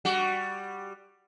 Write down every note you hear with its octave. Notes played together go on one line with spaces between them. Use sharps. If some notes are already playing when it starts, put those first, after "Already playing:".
G3 F#4